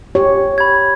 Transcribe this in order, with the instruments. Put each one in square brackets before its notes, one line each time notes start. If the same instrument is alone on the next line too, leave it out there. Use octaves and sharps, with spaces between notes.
[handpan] G4 C#5
[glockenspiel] B5 G#6